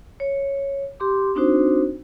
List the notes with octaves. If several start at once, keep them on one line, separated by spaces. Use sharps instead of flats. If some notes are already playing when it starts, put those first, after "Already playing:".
C#5
G4 C6 D6
C4 D4 D#4 F#4 C5